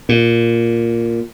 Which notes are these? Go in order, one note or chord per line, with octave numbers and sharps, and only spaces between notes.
A#2